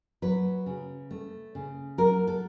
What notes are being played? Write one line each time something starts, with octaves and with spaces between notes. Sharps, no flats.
F#3 B4
C#3
A3
C#3
F#3 A#4
A4